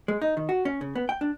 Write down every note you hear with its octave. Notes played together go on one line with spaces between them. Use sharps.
G#3
D#4
D#3
F#4
C#4
C#3
B3
G5
D4